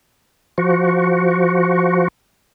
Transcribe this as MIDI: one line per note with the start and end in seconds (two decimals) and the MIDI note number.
0.58 2.08 53
0.58 2.08 66